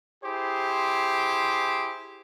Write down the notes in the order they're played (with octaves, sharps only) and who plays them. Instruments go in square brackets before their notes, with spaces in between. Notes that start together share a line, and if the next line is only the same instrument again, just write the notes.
[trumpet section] E4 G4 G#4 C5